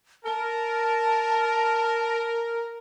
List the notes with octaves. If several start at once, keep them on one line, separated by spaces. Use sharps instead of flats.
A#4 A5